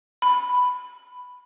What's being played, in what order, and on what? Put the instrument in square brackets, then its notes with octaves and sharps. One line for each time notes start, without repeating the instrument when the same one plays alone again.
[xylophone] B5